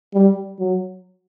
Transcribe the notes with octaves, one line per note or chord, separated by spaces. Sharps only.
G3
F#3